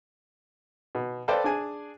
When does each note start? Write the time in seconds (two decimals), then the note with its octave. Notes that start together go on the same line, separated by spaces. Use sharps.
0.95 B2
1.28 A4 B4 C5 D5 F5 G5
1.44 D4 G#4 G#5